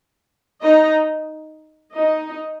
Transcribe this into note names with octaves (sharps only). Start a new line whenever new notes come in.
D#4 D#5
D#4 D#5